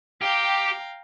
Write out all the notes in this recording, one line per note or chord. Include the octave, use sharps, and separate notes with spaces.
G4 F5 G5 A#5